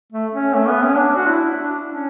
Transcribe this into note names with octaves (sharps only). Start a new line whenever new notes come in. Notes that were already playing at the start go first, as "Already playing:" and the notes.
A3
C#4
A3
B3
C#4
D4
F#4
E4
D4
C#4